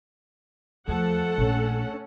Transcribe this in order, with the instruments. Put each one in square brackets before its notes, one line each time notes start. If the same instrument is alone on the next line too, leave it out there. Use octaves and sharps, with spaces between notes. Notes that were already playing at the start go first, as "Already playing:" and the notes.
[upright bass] E2 [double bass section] F3 [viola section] A3 A4 F#5
[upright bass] A#1 [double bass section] C#4